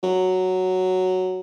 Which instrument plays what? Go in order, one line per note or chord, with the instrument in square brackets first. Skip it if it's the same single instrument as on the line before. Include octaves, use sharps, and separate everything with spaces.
[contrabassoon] F#3